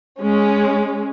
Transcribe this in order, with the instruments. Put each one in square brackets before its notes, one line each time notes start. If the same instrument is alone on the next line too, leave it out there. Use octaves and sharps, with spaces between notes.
[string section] G#3 C#4